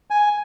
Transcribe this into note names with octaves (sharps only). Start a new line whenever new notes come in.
G#5